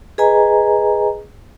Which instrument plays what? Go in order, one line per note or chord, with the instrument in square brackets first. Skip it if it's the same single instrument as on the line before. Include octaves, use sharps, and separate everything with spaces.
[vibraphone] G#4 B4 D#5 G#5 A#5